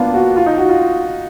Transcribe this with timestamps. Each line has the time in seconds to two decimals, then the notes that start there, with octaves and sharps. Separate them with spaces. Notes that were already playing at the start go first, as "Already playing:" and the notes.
Already playing: A#3 B3 D4 F4
0.14 F#4
0.36 F4
0.46 D#4
0.58 F#4
0.69 F4